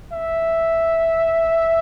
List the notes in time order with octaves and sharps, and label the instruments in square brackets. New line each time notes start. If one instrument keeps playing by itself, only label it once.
[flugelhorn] E5